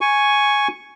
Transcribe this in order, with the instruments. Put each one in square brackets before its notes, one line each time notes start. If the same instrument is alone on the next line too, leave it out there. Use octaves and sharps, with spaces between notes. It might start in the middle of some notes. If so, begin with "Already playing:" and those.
[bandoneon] G#5 C#6